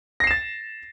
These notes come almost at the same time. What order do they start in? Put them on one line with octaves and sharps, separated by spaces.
A#6 C7 E7 A6